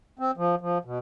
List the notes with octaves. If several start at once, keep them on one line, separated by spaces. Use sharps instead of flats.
C4
F3
F3
B2